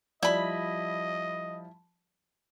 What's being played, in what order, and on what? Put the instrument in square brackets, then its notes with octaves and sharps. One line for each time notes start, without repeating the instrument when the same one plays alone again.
[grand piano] F3 G3 [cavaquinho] E4 B5 [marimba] D5 [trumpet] D#5